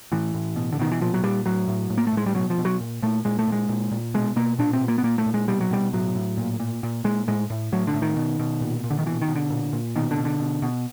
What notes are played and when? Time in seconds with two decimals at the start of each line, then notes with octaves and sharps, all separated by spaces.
0.12 A2 E3
0.34 A2
0.56 B2
0.72 D3
0.79 B2 D#3
0.91 E3
1.01 A#2 F3
1.14 F#3
1.23 A#2 G3
1.46 A2 F#3
1.68 A2
1.90 A2
1.97 A#3
2.07 A3
2.12 A2 G#3
2.26 G3
2.35 B2 F#3
2.50 F3
2.58 B2
2.65 F#3
2.81 A#2
3.02 A#2 A3
3.25 A#2 G#3
3.39 A3
3.48 A#2 G#3
3.69 A#2
3.91 A#2
4.14 B2 G#3
4.36 B2 A#3
4.59 A#2 D4
4.73 C4
4.81 A#2
4.88 A#3
4.98 B3
5.03 A#2 A#3
5.18 A3
5.26 A#2
5.34 G#3
5.48 B2 G3
5.61 F#3
5.71 B2 G3
5.93 A2 F#3
6.15 A2
6.37 A#2
6.60 A#2
6.83 A#2
7.04 A#2 G#3
7.27 A2 G#3
7.50 A2
7.72 A2 F#3
7.87 D3
7.94 A2
8.02 D#3
8.16 B2
8.39 B2
8.61 A#2
8.84 A#2
8.90 D3
8.99 D#3
9.06 B2 E3
9.21 D#3
9.28 B2
9.35 D3
9.50 A#2
9.73 A#2
9.96 B2 D#3
10.11 D3
10.18 B2
10.25 D3
10.40 B2
10.62 B2